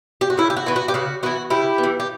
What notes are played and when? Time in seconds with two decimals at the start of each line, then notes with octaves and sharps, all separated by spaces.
0.21 G4
0.30 F#4
0.37 C#3 E4
0.50 G4
0.56 F#4
0.66 E3 B3
0.76 F#4
0.88 G4
0.94 C#3 F#4
1.23 E3 B3 F#4
1.50 C#3 E4 G4
1.78 B3
1.84 E3
2.00 G4